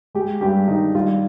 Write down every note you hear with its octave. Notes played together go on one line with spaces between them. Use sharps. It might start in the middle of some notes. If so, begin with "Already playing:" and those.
G#3 G4
G2 G4
D#3 D#4
G3 F4